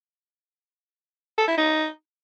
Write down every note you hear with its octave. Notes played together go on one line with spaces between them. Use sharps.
A4
E4
D#4